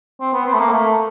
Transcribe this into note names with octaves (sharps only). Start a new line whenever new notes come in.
C4
B3
C4
A3
A#3
A3